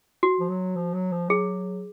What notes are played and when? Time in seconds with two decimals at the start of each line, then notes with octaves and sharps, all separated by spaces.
0.23 F#4
0.40 F3
0.49 F#3
0.76 F3
0.94 F#3
1.12 F3
1.29 F#3 G#4